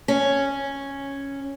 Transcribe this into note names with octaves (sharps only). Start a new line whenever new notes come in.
C#4